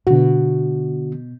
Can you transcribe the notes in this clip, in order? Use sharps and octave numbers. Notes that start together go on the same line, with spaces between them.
B2 D3 F#4